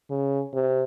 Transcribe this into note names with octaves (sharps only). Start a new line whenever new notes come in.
C#3
C3